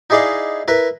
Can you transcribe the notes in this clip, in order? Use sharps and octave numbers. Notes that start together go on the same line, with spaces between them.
D#4 E4 G#4 D5 D#5 F5
E4 A#4 B4